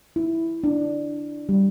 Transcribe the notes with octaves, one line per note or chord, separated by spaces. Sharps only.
E4
D4
G3